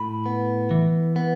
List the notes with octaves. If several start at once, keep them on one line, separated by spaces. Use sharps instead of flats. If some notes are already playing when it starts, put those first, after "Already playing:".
Already playing: A2 B5
B3
E3
B3